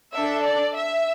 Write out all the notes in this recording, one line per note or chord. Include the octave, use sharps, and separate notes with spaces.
D4 A4 E5
D5
E5